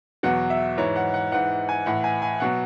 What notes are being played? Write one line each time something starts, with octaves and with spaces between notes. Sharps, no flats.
E2 B2 F#3 F#5
E5
G#2 E3 C#5
F#5
F#5
G#2 E3 F#5
G#5
A2 E3 F#5
G#5
G#5
B2 F#3 F#5